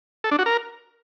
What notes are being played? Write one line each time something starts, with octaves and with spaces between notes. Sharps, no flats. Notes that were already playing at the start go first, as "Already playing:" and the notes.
A4
D4
F#4
A#4